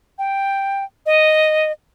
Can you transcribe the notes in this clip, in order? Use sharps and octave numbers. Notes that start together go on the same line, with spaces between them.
G5
D#5